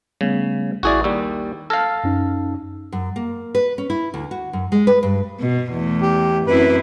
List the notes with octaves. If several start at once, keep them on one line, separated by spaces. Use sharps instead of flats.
C#3 G3 A3 B3
A1 E4 F#4 G#4 D5 E5
D#2 G3 E6
A4 F5 F6 G#6 A#6
F#2 C#4 D#4
F#2
A#3
B4
C#4
E4
D2
F#4
F#2
G#3
B4
G2
B2
E2 A3
G4
F#2 C4 E4 B4